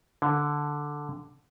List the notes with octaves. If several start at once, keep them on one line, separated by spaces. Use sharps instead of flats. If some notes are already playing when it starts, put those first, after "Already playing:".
D3